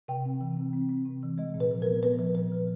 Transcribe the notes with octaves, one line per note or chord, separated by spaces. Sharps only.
C3 G5
C4
E3
C4
C4
C4
C3
E3
G#3 D#5
A#2
B4
F3
B3 A#4
B3 B4
F3
A#2 B4
F3